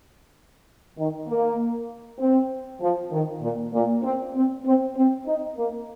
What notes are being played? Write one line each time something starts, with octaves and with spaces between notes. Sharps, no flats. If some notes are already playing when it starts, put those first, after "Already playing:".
D#3
A#3
C4
F3
D#3
A#2
A#2
C4
C4
C4
C4
D#4
A#3